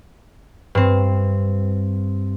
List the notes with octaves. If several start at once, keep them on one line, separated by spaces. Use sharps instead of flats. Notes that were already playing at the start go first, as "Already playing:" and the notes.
G2 C4